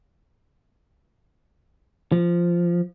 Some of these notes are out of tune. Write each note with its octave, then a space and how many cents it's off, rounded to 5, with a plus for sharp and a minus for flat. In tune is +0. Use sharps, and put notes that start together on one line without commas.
F3 -10